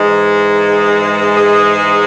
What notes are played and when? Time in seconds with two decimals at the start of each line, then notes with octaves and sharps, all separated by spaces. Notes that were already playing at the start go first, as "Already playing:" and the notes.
Already playing: G#2 E3 G#3
1.37 G#4